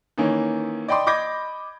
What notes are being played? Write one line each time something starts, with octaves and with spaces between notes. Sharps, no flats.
D#3 E3 A#3 C#4
D5 D#5 G5 B5 C6 D6
D#5 B5 D6 G6 G#6 A#6